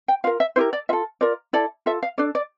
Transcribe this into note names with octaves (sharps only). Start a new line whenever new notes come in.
G5
F4 A#4 F5
E5
E4 G4 A#4 C5
D5
F4 A4 E5
F4 A#4 D5
E4 A4 D5
F4 A4 E5
F5
D4 A4 D5
D5